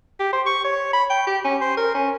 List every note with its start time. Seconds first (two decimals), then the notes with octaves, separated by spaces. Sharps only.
0.19 G4
0.33 C5
0.46 C#6
0.64 C#5
0.93 B5
1.10 G5
1.27 G4
1.44 C#4
1.61 C5
1.77 A#4
1.94 C#4